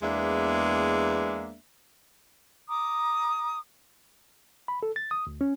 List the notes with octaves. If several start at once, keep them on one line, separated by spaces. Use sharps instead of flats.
E2 G#3 A#3 B3 D4 E5
A#5 D6 D#6
B5
A4
A6
D#6
D2
C#4